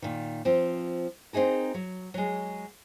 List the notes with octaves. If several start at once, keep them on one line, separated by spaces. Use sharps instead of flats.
A#2 D#3
F3 C4
C4 C#4 D#4 G#4 A#4
F#3
F#3 G#3